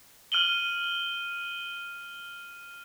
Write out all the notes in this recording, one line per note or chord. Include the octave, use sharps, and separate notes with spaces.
F6 D#7 F#7 G7